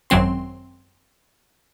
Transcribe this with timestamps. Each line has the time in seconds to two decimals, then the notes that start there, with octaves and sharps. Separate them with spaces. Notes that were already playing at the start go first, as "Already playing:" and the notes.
0.10 G#1 F#2 F#3 C4 C6